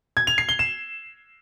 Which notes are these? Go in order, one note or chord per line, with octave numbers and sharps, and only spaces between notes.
G#6
F7
C7
G7
E7